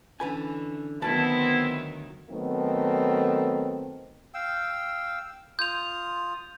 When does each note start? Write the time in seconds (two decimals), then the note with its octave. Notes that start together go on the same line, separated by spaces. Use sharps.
0.20 D3 E3 C#4 B4 G#5
1.02 D2 D#3 F#3 B3 C4 E4 B4 A5
2.30 D#3 F#3 A3 B3 C4
4.34 F5 G5 E6
5.59 F4 D#6 G6 F7